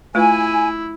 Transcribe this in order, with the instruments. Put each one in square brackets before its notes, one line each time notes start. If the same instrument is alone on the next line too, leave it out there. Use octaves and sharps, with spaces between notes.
[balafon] A3 F4 B4 [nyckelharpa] E4 [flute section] G#5